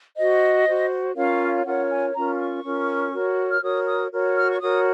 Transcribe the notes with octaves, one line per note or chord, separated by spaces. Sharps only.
F#4 C5 D#5
F#4 C5
C#4 F4 A#4 C#5 F5
C#4 F4 A#4 C#5 F#5
G#5
C#4 F4 A#4 A#5
C#6
C#4 F4 A#4
F#4 A#4 C#5
F6
F#4 A#4 C#5 D#6
D#6
F#4 A#4 C#5
F6
C#6
F#4 A#4 C#5 D#6